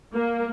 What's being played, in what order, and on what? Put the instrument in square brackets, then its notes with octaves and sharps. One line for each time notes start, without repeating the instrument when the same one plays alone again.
[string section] A#3